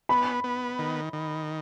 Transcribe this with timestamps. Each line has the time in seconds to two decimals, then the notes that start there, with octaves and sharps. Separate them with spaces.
0.09 B3 B5
0.44 B3
0.79 D#3
1.13 D#3